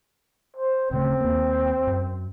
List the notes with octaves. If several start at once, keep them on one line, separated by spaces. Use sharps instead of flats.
C5
D1 C#3 A3 C4
D#2 A#3
F#2